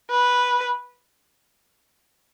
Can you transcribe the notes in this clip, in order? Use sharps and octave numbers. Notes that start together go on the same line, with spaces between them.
B4